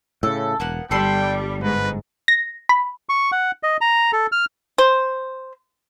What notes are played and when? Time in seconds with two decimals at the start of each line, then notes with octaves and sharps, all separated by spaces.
0.23 A2 C#3 A4
0.60 E1 A#3 B3 F#5
0.91 G1 G3 A4 G5 B5 C6
1.63 G#2 B4
2.28 A#6
2.69 B5
3.09 C#6
3.32 F#5
3.63 D#5
3.81 A#5
4.13 A4
4.32 F6
4.78 C5